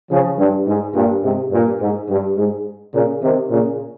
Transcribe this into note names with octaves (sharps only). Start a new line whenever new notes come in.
C#3 F3
G2
G#2
G2 A#2
G#2 C3
G2 A#2
G#2
G2
G#2
A#2 C#3
C3 D#3
A#2 C#3